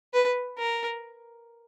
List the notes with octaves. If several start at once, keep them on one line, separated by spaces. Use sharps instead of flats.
B4
A#4